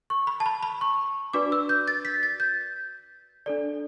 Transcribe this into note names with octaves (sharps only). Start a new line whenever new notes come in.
C#6
B5
A5
B5
B5
C#6
D4 F#4 B4 D5 D6
E6
G6
A6
B6
A6
G6
D4 A4 D5